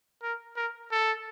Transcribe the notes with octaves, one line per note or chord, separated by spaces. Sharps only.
A#4
A#4
A4